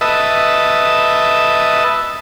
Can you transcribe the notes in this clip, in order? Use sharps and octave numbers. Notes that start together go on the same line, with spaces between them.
B4 D#5 E5 A5